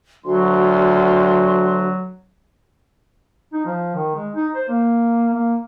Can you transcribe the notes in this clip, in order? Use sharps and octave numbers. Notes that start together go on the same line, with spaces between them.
D2 F#3 F#4 C6
D#4
F3
D#3
G#3
D#4
C5
A#3
A#3